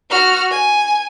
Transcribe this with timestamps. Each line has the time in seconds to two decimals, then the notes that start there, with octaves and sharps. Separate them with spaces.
0.10 F#4 F6
0.51 G#5